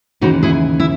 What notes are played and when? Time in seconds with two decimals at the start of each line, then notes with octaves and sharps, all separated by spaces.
0.21 D#2 C#3 E3 D#4 F#4
0.43 E4 G#4
0.80 E4